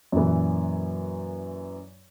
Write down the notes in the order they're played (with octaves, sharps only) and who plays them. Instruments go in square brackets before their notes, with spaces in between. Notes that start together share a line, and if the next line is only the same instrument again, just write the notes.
[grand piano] F#2 A#2 E3